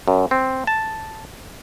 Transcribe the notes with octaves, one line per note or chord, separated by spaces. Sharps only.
F#2
C4
A5